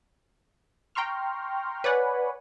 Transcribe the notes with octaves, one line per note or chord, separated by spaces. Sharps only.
G5 A#5 C6 C#6 F6
B4 C#5 D5 F#5 G#5 B5